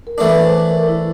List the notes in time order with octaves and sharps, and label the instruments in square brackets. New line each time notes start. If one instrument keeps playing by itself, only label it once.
[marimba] A#4
[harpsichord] E3 A3 D4 [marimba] B4
[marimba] B4
C5
B4
A#4
E4